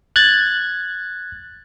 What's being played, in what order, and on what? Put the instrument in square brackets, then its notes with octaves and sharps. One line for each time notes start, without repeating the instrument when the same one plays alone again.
[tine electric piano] F#6 G#6 A6